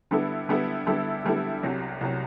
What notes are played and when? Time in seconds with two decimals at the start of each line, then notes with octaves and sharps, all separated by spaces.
0.11 D3 G3 B3 E4 A4
0.49 D3 G3 B3 E4 A4
0.87 D3 G3 B3 E4 A4
1.25 D3 G3 B3 E4 A4
1.63 C2 C3 F#3
2.01 C2 C3 F#3